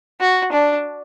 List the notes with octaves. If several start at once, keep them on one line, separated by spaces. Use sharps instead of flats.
F#4
D4